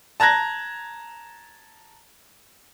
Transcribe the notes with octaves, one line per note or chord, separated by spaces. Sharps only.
A5 A#5 F#6 G#6 A#6